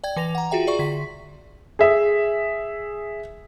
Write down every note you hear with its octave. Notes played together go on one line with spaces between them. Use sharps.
D5 G5 G#6
E3 B4 A#6 F7
F#5 A#5
F4 F#4 G#4 E5 G5
G#4 D5 E5 C#6
D3 B6
G#4 E5